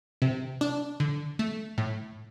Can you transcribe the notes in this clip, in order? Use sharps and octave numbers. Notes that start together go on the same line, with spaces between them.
C3
D4
D3
A3
A2